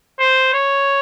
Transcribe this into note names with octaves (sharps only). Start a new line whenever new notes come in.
C5
C#5